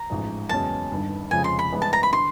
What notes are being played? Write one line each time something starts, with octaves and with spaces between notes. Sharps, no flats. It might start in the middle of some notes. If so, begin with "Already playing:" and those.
Already playing: A#5
A1 G#2 F3 G#3
F#1 E2 B2 G#3 C#4 A5
G1 G2 D#3
F1 F2 C#3 F3 G#3 G#5
C6
B5
G2 E3 G#3 B3 D4
A5
A#5
B5
D3 C6